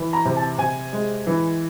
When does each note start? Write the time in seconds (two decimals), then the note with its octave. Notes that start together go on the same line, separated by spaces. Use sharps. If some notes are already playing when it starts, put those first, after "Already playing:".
Already playing: E3
0.13 A#5
0.25 C3
0.37 A5
0.58 C3 G#5
0.93 G#3
1.27 E3